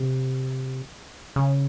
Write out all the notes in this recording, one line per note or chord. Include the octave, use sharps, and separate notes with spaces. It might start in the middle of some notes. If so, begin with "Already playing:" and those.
Already playing: C3
C#3